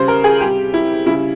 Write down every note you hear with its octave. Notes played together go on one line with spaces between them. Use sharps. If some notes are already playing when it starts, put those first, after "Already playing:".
Already playing: C#3 G3 C5
A#4
G#4
C3 G3 G4
E4
C#3 G3 E4